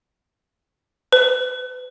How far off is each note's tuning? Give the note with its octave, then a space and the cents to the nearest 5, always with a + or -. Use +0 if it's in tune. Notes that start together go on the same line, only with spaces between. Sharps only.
B4 +35